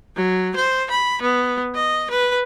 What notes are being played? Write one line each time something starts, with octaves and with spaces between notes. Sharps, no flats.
F#3
C5
B5
B3
D#5
B4